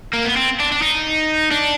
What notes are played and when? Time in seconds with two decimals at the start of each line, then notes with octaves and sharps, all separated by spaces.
0.13 A#3
0.25 B3
0.36 C4
0.60 D4
0.72 D4
0.82 D#4
1.51 D4